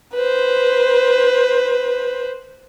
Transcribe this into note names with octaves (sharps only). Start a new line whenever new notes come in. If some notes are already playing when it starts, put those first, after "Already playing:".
B4 C5